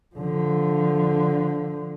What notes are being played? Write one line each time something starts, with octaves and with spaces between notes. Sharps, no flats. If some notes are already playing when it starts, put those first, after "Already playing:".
D3 F3